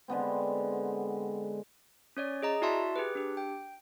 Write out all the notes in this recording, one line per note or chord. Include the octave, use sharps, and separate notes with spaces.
D3 G#3 B3 C4
C#4 C#5 D5
G#4 D#5 A#5
E4 F#4 D5 E5 A5 C6
G4 G#4 B4
D4 G4
G5